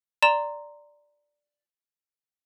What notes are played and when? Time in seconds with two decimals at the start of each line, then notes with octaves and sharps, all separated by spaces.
0.22 D5 A#5 C6 E7